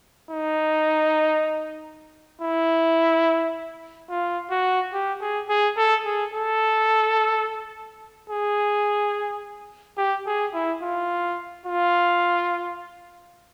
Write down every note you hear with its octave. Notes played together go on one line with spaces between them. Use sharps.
D#4
E4
F4
F#4
G4
G#4
G#4
A4
G#4
A4
G#4
G4
G#4
E4
F4
F4